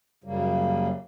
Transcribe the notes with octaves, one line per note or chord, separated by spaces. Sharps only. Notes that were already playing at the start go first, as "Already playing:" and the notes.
F#2 C#3 G3 A#3